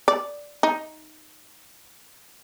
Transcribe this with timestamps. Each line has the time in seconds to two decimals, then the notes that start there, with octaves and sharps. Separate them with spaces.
0.08 D5
0.63 D#4